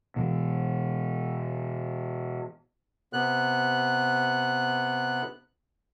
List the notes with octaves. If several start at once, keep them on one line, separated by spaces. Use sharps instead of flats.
B2 E3
C3 B3 F#6